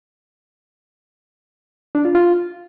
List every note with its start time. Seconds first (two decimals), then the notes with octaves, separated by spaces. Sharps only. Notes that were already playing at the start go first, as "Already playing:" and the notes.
1.95 D4
2.05 F4
2.15 F4